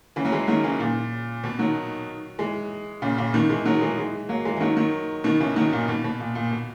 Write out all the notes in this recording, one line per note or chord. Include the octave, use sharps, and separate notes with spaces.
C#3 E3
F#3
E3 G#3
D#3 F#3
C#3 E3
A#2
B2
D#3 F#3
E3 G#3
A#2 C#3
A#2 C#3
B2 D#3
E3 G#3
D#3 F#3
E3 G#3
E3 G#3
F#3 A#3
E3 G#3
E3
D#3 F#3
D#3 F#3
B2 D#3
C#3 E3
D#3 F#3
A#2
B2
B2
A#2
A#2
B2